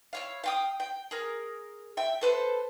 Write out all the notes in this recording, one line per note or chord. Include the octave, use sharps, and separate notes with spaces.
E4 C#5 F5
F5 G5 D#6
G5
G#4 A#4
E5 G5
A4 B4 C5